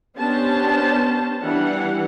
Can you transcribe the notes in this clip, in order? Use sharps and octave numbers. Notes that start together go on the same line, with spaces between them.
B3 C#4 D4 G4 C5 A5
E3 G3 D4 F#5